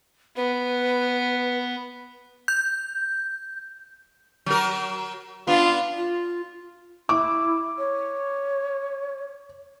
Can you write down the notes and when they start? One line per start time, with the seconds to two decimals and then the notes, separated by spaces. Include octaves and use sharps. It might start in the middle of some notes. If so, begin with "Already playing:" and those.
0.37 B3 B4
2.48 G6
4.46 F#3 A#4
5.47 B3 D4 F4
5.97 F4
7.09 E4 D6
7.78 C#5